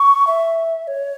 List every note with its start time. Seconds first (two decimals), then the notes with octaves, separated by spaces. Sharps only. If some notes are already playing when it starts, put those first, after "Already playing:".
Already playing: C#6
0.27 E5
0.87 C#5